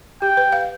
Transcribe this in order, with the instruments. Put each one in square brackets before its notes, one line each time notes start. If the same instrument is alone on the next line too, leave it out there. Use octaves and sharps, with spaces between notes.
[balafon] G4 [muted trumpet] G5
[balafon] B4
F5